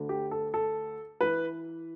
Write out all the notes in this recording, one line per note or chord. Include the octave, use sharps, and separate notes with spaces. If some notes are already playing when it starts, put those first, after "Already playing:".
Already playing: D2 D3
G4
A4
A4
E3 B4